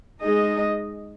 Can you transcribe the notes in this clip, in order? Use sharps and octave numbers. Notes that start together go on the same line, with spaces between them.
G#3 D#4 G#4 D#5